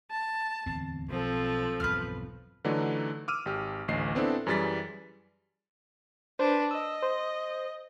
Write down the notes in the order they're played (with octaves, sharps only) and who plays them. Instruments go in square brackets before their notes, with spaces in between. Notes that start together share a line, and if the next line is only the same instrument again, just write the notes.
[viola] A5
[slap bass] D1 E2 C4
[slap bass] B1 [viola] F3 [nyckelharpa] C4 A4
[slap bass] B1 E2 G2 [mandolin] B4 F6
[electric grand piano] D3 E3 F#3 A3 D4 D#4
D6 E6 F6 D#7
G#1 G4
A1 D2 D#5 C7
B3 C4 D4 E4 A4
F#2 E3 G3 G#4 A6 B6
[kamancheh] D4 B4 [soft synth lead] C5
[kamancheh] D#5 [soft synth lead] E6
[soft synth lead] C5